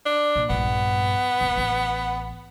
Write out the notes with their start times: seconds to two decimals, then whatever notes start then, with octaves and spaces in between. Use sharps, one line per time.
0.06 D4
0.36 A#2
0.50 A#1 G2 B3
1.41 D#1
1.57 A1